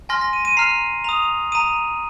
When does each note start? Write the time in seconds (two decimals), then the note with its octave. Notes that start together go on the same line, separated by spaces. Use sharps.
0.09 G#5 C6 F6 A#6
0.21 A#6
0.33 D#7
0.45 D#7
0.57 A#5 F6 C7
1.04 A#5 D#6 F7
1.52 A#5 D#6 D#7